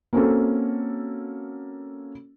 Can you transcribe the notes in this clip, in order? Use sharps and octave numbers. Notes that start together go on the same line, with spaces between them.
A#3 C4 C#4 F#4 A4